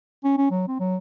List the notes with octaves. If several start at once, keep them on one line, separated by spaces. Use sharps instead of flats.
C#4
C#4
F#3
C4
F#3